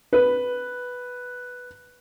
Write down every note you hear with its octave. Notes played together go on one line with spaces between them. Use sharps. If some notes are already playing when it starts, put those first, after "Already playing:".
B4